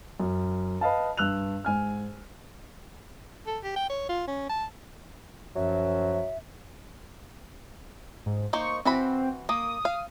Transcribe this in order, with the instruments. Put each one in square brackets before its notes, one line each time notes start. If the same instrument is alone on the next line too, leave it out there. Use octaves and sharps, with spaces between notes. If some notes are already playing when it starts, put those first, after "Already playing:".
[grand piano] F#2
B4 D#5 F5 A5
G2 E6 F#6 F7
G#2 G#5 F6
[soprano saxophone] A4
G4
G5
C#5
F4
C#4
A5
[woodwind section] F#2 F3 [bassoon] F#3 [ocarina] E5
[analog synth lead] G#2
[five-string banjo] A#3 D#4 C5 [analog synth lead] C#6
[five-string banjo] E3 F#4 B5 [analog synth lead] C4
[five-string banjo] A#3 [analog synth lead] D#6
[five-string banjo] F5